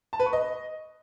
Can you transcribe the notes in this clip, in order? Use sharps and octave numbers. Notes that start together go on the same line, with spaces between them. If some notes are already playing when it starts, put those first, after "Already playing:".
A5
B4
C#6
D#5